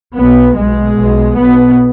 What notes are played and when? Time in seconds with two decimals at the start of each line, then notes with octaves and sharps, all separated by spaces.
0.17 B1 B2 B3
0.57 B1 B2 G#3
0.97 B1 B2
1.36 B1 B2 B3